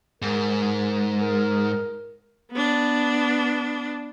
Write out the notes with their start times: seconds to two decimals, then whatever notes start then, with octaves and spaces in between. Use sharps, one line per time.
0.22 G#2 A#4
1.21 A#4
2.52 B3 D4